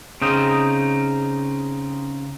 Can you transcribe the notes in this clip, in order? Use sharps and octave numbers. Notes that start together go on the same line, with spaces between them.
C#3 C4 D#4